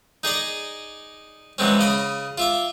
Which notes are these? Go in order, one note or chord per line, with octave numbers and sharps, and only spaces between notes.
D#4 G#4 D5 D#5
E3 F#3 G#3 C4 C#4
C#3 D#5 B5
F4 E5 D6